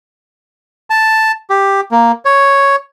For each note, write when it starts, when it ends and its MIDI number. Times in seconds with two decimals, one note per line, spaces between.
0.90 1.32 81
1.50 1.81 67
1.91 2.12 58
2.25 2.76 73